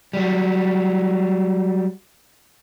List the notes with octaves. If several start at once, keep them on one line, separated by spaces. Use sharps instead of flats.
F#3 G3